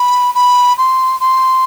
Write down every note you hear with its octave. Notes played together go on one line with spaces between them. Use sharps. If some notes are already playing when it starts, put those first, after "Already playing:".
Already playing: B5
B5
C6
C6